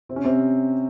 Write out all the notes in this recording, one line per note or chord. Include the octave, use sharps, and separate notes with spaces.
C3 C4
C#4
C3 C4